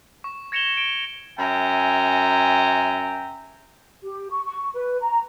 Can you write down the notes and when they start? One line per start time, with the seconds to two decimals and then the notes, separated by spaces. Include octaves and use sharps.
0.24 C#6
0.52 G#6 A#6 C#7 E7 F7 G7
0.77 D7 G7
1.39 F#2 E5 G5 G#5 A#5
4.02 G4
4.30 C#6
4.44 C#6
4.73 B4
5.00 A#5